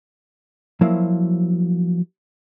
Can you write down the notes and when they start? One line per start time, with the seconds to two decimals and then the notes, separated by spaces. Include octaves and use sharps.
0.81 F3 F#3 A#3 E4 C5 F5